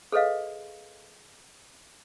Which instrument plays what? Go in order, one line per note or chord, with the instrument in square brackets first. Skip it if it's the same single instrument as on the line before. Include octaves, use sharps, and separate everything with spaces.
[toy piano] G#4 A4 B4 D#5 F5